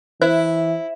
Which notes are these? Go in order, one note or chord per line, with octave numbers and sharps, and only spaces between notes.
E3 E4 C5